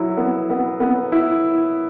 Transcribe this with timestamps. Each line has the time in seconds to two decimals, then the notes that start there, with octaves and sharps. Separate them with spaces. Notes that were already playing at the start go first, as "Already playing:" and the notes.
Already playing: F#3 E4
0.17 B3
0.50 B3
0.80 B3
1.12 E4